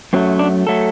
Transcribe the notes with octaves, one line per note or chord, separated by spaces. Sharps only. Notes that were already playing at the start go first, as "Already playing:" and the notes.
F#2 F#3 A3 C4
D4
F#3 A3 A4